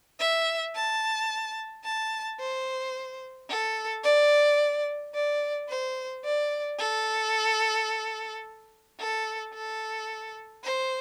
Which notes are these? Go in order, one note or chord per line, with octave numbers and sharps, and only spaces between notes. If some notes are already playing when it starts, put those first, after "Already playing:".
E5
A5
A5
C5
A4
D5
D5
C5
D5
A4
A4
A4
C5